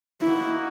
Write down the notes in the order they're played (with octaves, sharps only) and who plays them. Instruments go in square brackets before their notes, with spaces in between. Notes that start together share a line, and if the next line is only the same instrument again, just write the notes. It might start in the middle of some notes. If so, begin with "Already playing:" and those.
[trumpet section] A#3 D#4 F#4 [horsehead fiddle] E4